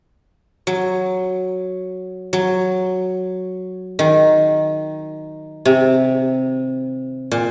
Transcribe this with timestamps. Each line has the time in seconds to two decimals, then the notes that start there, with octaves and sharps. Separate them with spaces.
0.67 F#3
2.33 F#3
3.99 D#3
5.65 C3
7.31 A#2